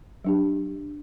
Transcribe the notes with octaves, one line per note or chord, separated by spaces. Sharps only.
F#3 D4 G4